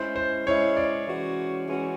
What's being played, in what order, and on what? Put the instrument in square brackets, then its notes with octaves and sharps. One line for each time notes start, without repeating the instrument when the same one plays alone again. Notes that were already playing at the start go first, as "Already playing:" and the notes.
Already playing: [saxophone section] G#3 C#4 E4 [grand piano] C5
[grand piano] C5
[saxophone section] G#3 C#4 E4 [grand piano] C#5
[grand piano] D5
[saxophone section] E3 G#3 C#4 F#4
E3 G#3 C#4 F#4